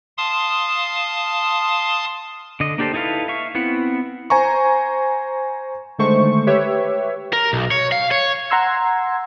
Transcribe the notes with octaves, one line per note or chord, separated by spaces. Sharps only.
F5 A5 C6 D#6
D3 D#5
A#3 D4 G4 A4 C5
D#4 E4 A4 B4 F5
E5 F5 C#6
B3 C4 E4 F#5
C5 G#5 A#5 C#6
D3 D#3 G#3 A3 C5 C#6
G4 B4 C#5 E5
A#4
B1
C#5
F5
C#5
F#5 A#5 C6 E6 G#6